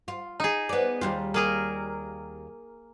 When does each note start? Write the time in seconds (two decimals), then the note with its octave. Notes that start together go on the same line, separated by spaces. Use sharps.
0.08 F4
0.40 D#4 G#4
0.69 B3 D5
1.01 D#2 G3 F4
1.34 A#3 G#4 A#4